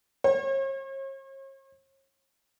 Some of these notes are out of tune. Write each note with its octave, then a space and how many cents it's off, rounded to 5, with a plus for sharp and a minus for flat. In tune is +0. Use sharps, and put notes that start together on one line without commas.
C#5 -40